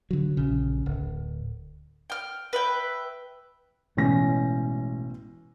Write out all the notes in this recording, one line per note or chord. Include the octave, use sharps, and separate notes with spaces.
D3 F#3
A#1 C#3
D1
G5 F6
B4 E5 G5
A1 B2 G#3 A3 C#4 A#6